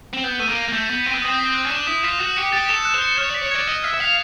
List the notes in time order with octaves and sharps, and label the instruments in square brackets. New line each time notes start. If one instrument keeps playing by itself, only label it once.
[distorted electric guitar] C4
[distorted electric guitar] B3 [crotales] G6
[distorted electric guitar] A3 [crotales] D#7
[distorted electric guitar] A#3
[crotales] A#6
[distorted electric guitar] A#3
[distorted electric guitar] A3 [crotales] G6
[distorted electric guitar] B3 [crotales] G6
[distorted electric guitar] C4 [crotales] D#7
[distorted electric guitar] B3
[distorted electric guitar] C4 [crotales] D#6
[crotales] B6
F#6
[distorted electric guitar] C#4
[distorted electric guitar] D4 [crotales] E7
[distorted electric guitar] E4 [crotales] D#6
[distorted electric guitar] F4 [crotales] B6
[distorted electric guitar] F#4 [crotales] F#6
[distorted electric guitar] G4 [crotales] C#7
[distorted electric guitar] G4 [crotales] A6
[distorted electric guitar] A4 [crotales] E7
[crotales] F#6
[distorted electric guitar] C5
[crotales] C#7
[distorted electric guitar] C#5 [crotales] F6
[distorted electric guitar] D5 [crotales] B6
[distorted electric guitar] C#5
[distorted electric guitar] D5 [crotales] G#6
[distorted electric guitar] D#5 [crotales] D7
[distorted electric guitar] E5 [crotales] F6
[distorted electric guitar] E5
[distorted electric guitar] F5 [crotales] B6